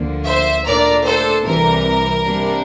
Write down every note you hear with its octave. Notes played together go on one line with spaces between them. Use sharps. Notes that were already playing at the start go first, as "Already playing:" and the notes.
Already playing: D2 D3 F3 A#3
C5 E5
A#2 A3 D4 A#4 D5
A4 C5
C2 C3 E3 G3 A#4
C3 G3 A#3 D4